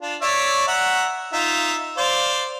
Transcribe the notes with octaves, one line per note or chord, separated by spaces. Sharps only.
D4 F4
C#5 D5 E5
E5 F#5 A#5
D#4 F4 E5
C5 D5 F5